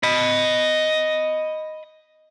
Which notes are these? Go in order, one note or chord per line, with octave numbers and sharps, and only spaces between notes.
D#5 B5